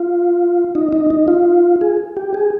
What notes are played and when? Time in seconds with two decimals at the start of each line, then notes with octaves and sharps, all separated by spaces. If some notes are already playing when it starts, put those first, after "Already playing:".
Already playing: F4
0.75 D#4
0.92 D#4
1.10 D#4
1.28 F4
1.81 G#4
2.17 G4
2.34 G#4